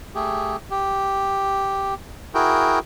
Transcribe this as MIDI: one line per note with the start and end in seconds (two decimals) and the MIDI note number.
0.15 0.57 57
0.15 0.57 67
0.15 0.57 68
0.71 1.94 67
2.34 2.79 64
2.34 2.79 66
2.34 2.79 68
2.34 2.79 70
2.34 2.79 79